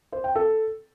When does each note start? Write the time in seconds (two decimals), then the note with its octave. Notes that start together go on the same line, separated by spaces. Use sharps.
0.12 C5
0.24 G5
0.35 A4